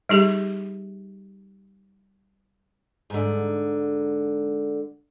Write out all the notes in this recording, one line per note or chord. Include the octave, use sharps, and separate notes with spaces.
G3 D#4 G4 G#4
G#2 D3